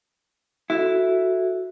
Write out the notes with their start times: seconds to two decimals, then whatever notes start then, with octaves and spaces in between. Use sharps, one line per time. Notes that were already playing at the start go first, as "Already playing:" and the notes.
0.70 E4 F#4 A4